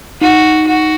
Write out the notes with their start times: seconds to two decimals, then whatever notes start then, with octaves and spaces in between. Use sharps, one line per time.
0.21 D#4 F#4
0.66 F#4